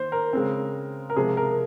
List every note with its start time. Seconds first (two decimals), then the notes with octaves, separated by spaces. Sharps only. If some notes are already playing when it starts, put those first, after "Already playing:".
Already playing: D#3 A#3 C5
0.12 A#4
0.33 C#3 G#3 C4
1.10 A#4
1.16 C3 F3 G#3 G#4
1.37 A#4